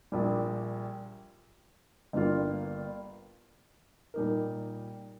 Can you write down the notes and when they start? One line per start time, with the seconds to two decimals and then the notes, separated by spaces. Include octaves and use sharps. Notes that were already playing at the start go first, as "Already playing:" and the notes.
0.12 A#1 A#2 G3
2.13 G1 G2 G3 A#3 F4
4.14 A#2 G3 D#4 A#4